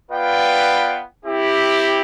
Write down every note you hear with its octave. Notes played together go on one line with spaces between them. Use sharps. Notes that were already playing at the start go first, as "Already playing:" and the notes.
B3 F4 B4 D5 G5
C4 E4 G4